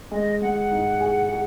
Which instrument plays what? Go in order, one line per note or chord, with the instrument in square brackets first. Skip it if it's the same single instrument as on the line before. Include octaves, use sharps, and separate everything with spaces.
[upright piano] G#3 [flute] D#5
[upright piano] G#3 [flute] F#5
[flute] F#5
[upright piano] G#2
G#4
G#4